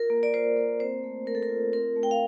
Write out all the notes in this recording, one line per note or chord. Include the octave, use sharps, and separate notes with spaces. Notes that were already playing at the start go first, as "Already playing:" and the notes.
Already playing: F4 A#4
A#3
D5
F4 C5
A#3
C4 C5
A3
A3 A#4
A4
A#4
F4
C4 A#4
A3
G5
F5